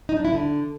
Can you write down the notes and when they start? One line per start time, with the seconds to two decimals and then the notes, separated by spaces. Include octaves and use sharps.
0.09 D#4
0.17 D4
0.25 E4
0.32 D3